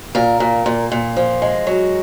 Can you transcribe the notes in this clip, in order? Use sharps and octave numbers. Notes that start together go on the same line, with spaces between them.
A#2 A#4
A#2
A#2
A#2
F3
G#3
F#3